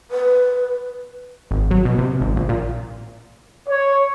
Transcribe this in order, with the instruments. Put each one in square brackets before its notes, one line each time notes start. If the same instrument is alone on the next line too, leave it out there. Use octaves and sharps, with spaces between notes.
[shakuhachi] B4
[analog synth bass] G#1
F#3
B2
C3
G#1
A#1
A#2
[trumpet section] C#5